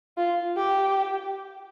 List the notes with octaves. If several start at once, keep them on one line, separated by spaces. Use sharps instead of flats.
F4
G4